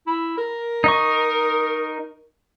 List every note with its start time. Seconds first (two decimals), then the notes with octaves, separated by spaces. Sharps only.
0.07 E4
0.37 A#4
0.84 D#4 D#5 C#6